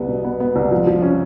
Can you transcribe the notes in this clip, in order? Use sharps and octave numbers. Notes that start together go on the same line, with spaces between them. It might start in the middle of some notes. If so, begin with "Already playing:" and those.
Already playing: C2 B3
B2
B3
B3
C2
F3
F3
C#4